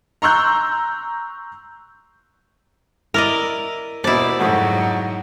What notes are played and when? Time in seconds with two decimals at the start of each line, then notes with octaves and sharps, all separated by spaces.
0.22 A#5 C6 C#6 E6 F#6 G6
3.14 E4 A#4 D5 D#5
4.04 D#2 B2 E4 C5 D5
4.39 F2 G#2 C#3 F#3 A3 F#5